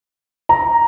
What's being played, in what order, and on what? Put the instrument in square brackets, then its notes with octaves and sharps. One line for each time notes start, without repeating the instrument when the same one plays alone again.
[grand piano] A#5